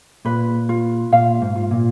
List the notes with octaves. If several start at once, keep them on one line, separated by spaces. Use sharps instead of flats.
A#2 B4
F4
A#2 F5
G#2
F4
A#2